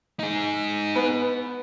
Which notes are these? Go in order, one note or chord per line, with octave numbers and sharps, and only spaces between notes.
D#4 G#4
B3 B4